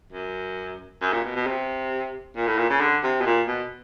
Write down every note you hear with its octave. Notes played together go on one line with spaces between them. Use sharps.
F#2
F#2
A#2
B2
B2
C3
A#2
A2
A#2
C#3
D3
C3
B2
A#2
B2